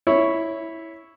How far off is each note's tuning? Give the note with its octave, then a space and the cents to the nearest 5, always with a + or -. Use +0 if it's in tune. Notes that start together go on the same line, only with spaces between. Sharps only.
E4 -5 C#5 +0